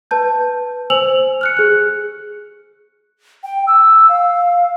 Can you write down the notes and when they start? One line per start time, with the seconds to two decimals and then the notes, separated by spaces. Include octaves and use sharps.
0.11 B4 A5 G6
0.90 C5 G#5 E6 F7 F#7
1.41 F6 F#6 C#7
1.57 G#4 F#6
3.43 G5
3.67 E6
4.09 F5